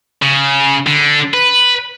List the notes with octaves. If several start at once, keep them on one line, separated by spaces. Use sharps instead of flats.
C#3
D3
B4